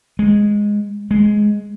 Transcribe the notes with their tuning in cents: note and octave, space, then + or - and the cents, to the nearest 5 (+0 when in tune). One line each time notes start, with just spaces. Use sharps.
G#3 -5
G#3 +5